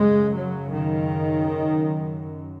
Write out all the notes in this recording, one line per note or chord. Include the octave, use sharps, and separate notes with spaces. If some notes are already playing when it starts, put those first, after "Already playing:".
Already playing: F#2 C#3 G#3
F#3
D#3